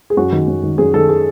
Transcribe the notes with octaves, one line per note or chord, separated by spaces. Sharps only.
G#4
F#2 F#4
D#3
F#2
D#3
F#2 G#4
D#3 A4
G#4